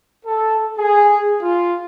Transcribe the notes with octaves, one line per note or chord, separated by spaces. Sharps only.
A4
G#4
F4